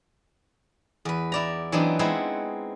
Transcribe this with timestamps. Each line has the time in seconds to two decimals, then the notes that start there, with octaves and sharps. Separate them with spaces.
1.05 E2 B4
1.32 E4 D5 A#5
1.72 E3 F#3 B3 C4 D4 D#4
1.99 G#3 B3 C4 D#4 E4 F#5